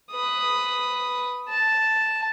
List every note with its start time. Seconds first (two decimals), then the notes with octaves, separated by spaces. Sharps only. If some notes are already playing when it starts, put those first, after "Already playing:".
0.12 B4 D#6
1.48 A5